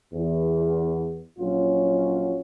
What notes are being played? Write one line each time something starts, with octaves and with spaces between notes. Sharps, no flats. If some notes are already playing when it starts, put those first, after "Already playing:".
E2
A#1 F#3 C#4 F4